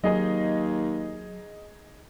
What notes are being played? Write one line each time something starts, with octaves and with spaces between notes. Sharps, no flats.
D#2 F#3 D#4 G#4 D#5